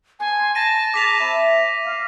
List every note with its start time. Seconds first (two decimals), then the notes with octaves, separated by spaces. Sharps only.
0.20 B3 G#5 A5 C6
0.39 C6
0.55 A5 A#6 D#7
0.94 G#4 A#4 A#5 D6 B6 F7
1.20 C4 E5 B5
1.85 B3 F5